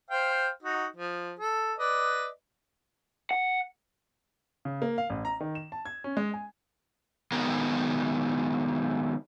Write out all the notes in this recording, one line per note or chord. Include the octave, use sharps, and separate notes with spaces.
C5 F5 G5
D#4 F#4
F3
A4
B4 D5 D#5
F#5
C#3
A#3
F5
A1
A#5
D#3
E7
A5
G#6
C#4
G#3
G#5
D#3 F#3 G#3 B3 A#4